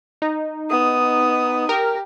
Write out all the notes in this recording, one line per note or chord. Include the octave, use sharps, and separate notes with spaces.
D#4
B3 D#6
G4 A#4